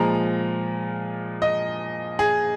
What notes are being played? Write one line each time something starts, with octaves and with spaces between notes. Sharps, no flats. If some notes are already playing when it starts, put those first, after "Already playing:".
Already playing: A#2 F3 G#3 A#5
D#5
G#4